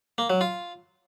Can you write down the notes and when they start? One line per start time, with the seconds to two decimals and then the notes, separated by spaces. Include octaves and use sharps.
0.18 A#3
0.30 F#3
0.41 F4